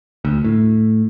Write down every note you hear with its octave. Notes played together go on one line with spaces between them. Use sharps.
D2
A2